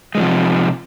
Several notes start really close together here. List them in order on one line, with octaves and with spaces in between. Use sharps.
G#3 D#3 F3 C3